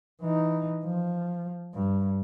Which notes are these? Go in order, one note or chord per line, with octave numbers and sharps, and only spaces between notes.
E3 D#4
F3
G2